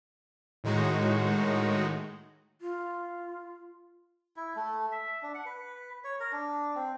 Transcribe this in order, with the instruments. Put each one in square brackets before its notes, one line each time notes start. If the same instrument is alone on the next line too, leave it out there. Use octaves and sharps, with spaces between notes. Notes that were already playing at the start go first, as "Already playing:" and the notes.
[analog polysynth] A2 D#3 G#3 D#4 F#4
[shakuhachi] F4
[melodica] E4
A3
E5
D4
F#5
B4
C#5
A#4
D4
C4